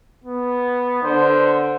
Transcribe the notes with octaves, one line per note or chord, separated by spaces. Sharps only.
B3
D3 C5